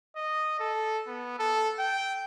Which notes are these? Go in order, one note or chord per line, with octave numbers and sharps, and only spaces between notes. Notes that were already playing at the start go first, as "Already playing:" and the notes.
D#5
A4
B3
A4
G5